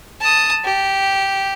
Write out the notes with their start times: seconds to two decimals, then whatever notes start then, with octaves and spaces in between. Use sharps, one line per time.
0.21 A5 D#6
0.64 G4